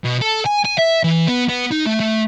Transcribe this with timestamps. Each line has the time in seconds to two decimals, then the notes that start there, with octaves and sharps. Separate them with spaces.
0.05 B2
0.21 A4
0.46 G#5
0.65 G#5
0.78 E5
1.04 E3
1.27 B3
1.49 B3
1.71 D#4
1.86 A3
2.00 A3